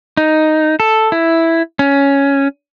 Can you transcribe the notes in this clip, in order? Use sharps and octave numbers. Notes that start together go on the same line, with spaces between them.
D#4
A4
E4
C#4